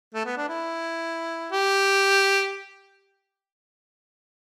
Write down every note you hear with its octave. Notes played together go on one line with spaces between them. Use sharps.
A3
B3
D4
E4
G4